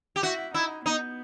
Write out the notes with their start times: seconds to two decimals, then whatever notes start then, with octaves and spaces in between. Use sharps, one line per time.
0.16 G4
0.23 E4 F#4
0.54 D#4 E4
0.86 B3 D#4